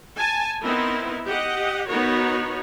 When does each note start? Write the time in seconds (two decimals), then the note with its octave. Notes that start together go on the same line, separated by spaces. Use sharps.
0.16 G#5 A5
0.62 B3 C4 D#4 E4 A#4
1.26 G4 D#5 F#5
1.88 B3 D#4 F#4 A#4 C#5